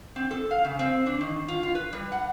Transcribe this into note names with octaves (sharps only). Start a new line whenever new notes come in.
C4
A4
F5
C#3
C4
D4
D#3
F4
F4
B4
G3
F#5